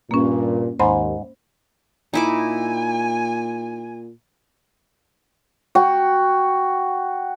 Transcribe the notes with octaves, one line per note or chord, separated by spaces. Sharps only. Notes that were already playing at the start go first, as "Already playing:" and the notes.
G2 A#2 A#3 C#4
D#2 G#2 C5 B5 C6
A#2 D#4 E4 G#5 D6
F#4 G5